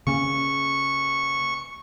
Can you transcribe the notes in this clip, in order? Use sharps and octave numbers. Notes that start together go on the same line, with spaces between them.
C#3 A#3 C#4 C#6